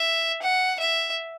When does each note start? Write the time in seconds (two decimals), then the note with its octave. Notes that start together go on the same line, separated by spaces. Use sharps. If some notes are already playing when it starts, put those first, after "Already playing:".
Already playing: E5
0.42 F#5
0.79 E5